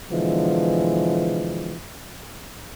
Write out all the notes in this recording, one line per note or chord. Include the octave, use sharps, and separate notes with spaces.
B2 D3 E3 F3 G#3